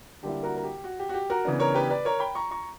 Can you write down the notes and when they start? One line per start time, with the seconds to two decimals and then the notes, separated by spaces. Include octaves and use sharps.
0.23 D3 G3 A#3 E4 G4
0.43 F#4 A#4
0.56 A#4
0.63 G4
0.84 F#4
0.99 G4
1.09 F#4
1.14 G4
1.30 F#4 A#4
1.45 C#3 E3 B3 D4
1.60 A#4 C#5
1.75 G4 B4
1.90 B4 D5
2.05 A#4 C#5
2.20 G5 B5
2.35 A#5 C#6
2.51 A#5 C#6